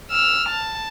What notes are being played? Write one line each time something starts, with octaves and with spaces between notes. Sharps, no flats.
E6 F6
A5